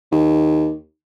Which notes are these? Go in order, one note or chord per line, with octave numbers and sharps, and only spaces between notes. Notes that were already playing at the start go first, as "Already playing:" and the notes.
D#2